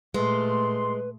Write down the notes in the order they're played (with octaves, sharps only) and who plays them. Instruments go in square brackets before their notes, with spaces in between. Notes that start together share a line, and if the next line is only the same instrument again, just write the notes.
[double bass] A#2 A3 [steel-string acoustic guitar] G#3 [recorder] B4 [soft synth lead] C6